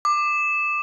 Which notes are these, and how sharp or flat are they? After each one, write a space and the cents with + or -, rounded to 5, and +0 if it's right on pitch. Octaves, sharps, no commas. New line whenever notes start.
D6 +20